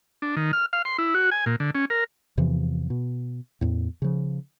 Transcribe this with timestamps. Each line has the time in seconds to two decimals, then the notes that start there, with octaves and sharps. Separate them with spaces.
0.22 D4
0.37 D#3
0.53 F6
0.73 F5
0.85 C6
0.98 E4
1.14 F#4
1.31 G#5
1.46 A#2
1.60 D3
1.75 C#4
1.90 A#4
2.37 E2 C3 E3 F3
2.90 B2
3.61 E2 A2
4.02 C#3 F3